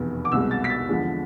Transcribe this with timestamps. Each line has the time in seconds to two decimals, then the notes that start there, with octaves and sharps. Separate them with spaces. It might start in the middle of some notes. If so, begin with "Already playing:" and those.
Already playing: F1 E2 B2
0.25 D6
0.32 C2 B2 G#3 E6
0.51 A6
0.64 B6
0.70 A6
0.89 E2 D3 F3 G#3